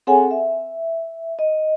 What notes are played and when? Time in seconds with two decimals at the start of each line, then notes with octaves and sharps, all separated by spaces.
0.07 C4 G#4 A4 C#5 F#5 G#5
0.31 E5
1.39 D#5